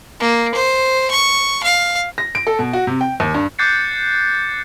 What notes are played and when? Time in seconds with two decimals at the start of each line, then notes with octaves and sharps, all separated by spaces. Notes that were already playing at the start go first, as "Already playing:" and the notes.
0.20 A#3
0.55 C5
1.11 C#6
1.63 F5
2.18 A#6
2.35 D7
2.47 A4
2.59 B2
2.73 F#4
2.87 C3
3.01 G5
3.20 D#2
3.34 G2
3.59 D6 F#6 G6 A6 C7 C#7